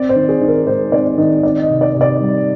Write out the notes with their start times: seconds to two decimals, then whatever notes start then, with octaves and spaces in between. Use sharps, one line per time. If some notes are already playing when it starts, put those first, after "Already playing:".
Already playing: C4 D5
0.09 C5
0.15 D#3
0.29 G#4
0.41 D#3
0.48 A#4
0.67 G#3 C5
0.92 C4 D5
1.18 D#3 D#5
1.43 C4 D5
1.62 D#5
1.69 C3
1.81 D5
1.95 C3
2.01 D5
2.20 G3